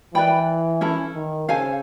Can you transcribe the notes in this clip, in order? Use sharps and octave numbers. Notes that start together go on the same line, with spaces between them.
E3 B4 D5 G5 B5
C#4 E4 A4
D#3
C#3 A4 C5 F5 G#5